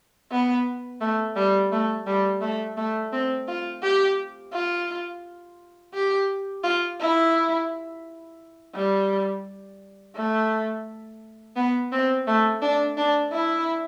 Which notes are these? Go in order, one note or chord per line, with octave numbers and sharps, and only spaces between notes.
B3
A3
G3
A3
G3
A3
A3
C4
F4
G4
F4
G4
F4
E4
G3
A3
B3
C4
A3
D4
D4
E4